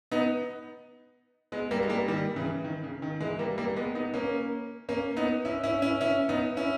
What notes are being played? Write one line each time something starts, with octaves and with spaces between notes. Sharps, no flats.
B3 D#4
G#3 B3
G3 A#3
G#3
G3 A#3
D#3 G3
C#3 E3
D#3
C#3
D#3
E3 G#3
G3 A#3
G3 A#3
G#3 B3
B3 D#4
A#3 C#4
A#3 C#4
B3 D#4
C#4 E4
C#4 E4
C#4 E4
C#4 E4
B3 D#4
C#4 E4